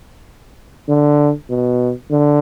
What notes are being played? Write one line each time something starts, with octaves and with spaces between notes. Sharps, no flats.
D3
B2
D3